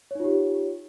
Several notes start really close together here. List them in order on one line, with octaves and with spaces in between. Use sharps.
C#5 D#4 F4 G4